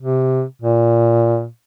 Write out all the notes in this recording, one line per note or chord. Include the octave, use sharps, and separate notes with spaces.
C3
A#2